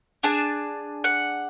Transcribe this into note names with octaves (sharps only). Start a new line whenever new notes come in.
D4 G#4 A5
F#5